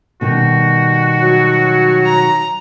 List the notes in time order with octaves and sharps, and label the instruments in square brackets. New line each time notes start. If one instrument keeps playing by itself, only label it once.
[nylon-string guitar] B2 D#3 G3 [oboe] F#4
[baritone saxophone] F#3
[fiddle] A#5